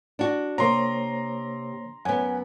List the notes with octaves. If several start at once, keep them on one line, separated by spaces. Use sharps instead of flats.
D4 F#4
C3 A#3 C5 C#5 A#5 C6
F#2 B3 F#5 G#5